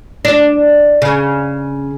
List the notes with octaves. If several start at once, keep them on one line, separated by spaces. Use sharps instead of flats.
D4
C#3